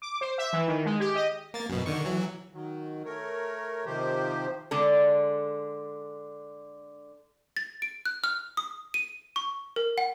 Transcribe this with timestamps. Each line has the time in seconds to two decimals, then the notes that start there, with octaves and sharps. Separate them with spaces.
0.02 D6
0.21 C5
0.38 E5
0.53 E3
0.68 D#3
0.86 G#3
1.00 G4
1.16 D#5
1.54 A#3 A6
1.69 F#2 B2
1.86 D3 D#3 C#6
2.05 E3 F#3
2.53 D#3 F#3
3.05 A3 A#4 C#5
3.86 C3 D#3 F3 G4 C5
4.71 D3 G#3 D4 A4
7.57 A6
7.82 D7
8.05 F#6
8.24 F6
8.57 D#6
8.94 D#7
9.36 C#6
9.76 A#4
9.98 F#5